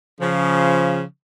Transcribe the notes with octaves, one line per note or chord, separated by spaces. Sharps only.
C#3 F3